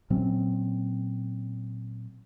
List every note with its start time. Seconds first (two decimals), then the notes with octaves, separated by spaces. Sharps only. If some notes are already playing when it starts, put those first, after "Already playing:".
0.10 A#2 F#3 C4 C#4